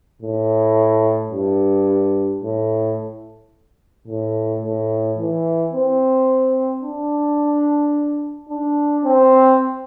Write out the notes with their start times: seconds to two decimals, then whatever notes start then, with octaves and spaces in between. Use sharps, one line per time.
0.22 A2
1.32 G2
2.43 A2
4.08 A2
4.62 A2
5.18 E3
5.73 C4
6.83 D4
8.49 D4
9.04 C4